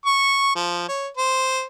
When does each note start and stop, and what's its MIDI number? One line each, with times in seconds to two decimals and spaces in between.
0.05 0.54 85
0.55 0.86 53
0.89 1.08 73
1.17 1.64 72